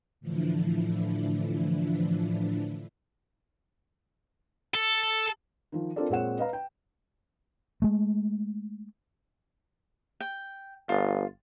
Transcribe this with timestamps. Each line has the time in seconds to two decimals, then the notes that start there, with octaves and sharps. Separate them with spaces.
0.21 A2 D3 E3 F3 D4 E4
4.74 A4
5.72 D#3 F3
5.96 C4 D4 F4 A4 A#4 D5
6.10 A#2 G#3 C4 C#5 F#5 E7
6.38 B4 D#5 F5 A#5
6.53 G5
7.82 G#3 A3
10.20 G5
10.89 G1 F4